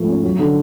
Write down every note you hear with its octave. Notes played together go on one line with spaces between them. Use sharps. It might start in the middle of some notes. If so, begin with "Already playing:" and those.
Already playing: G#2 F3 A3
C#4
F#3
D3